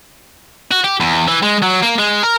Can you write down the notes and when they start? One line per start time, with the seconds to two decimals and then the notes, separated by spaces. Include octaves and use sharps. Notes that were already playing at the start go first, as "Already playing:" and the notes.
0.71 F#4
0.84 G4
1.01 E2
1.28 E3
1.43 G#3
1.63 F#3
1.83 A#3
1.99 G#3
2.23 A#4